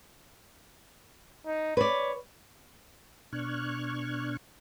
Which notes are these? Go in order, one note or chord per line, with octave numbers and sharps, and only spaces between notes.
D#4
B4 C#5 D5
B2 D4 C#6 F6 F#6 G#6